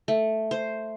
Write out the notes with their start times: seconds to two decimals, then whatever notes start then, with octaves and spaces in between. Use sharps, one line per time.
0.08 A3
0.51 C5